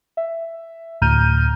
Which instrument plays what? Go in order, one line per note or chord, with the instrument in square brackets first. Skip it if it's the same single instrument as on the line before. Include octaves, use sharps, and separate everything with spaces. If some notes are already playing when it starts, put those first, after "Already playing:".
[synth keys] E5
D2 A2 A#5 F6 G6 D#7